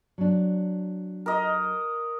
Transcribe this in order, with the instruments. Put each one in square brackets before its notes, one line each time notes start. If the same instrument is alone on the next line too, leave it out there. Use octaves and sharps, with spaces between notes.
[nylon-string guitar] F#3 D4
[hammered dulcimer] A#4 D#5